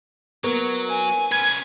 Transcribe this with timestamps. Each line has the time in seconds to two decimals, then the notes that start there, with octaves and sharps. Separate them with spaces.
0.44 F#3 A#3 B3 A#4
0.89 G#5
1.32 C#4 B4 G#6